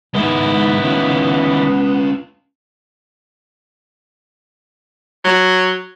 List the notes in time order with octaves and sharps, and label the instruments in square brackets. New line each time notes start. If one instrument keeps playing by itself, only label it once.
[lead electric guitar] G#2 G#3 [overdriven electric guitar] D#3 E4 [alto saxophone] B3
[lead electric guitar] C#4 F4
[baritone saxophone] F#3